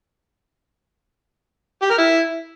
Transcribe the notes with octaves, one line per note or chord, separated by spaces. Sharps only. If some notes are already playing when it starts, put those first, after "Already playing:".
G4
A#4
E4